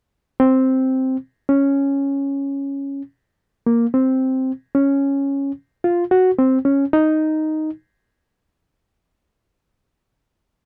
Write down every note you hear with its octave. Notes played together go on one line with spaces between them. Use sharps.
C4
C#4
A#3
C4
C#4
F4
F#4
C4
C#4
D#4